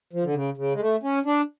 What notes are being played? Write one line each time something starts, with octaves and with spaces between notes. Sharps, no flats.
F3
D3
C#3
C#3
G#3
A3
C#4
D4